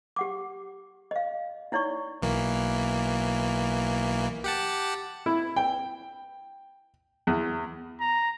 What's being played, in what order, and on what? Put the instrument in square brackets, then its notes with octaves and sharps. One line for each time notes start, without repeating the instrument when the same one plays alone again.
[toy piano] G4 F#5 D6
D#5 F5
D#4 E4 C#5 D5 C#6
[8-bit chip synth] B1 E3 A#3
G4 F#5 A5
[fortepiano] E4
G5
E2
[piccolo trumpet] A#5